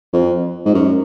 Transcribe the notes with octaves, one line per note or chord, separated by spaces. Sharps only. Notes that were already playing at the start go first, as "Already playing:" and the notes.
F2
G#2
F#2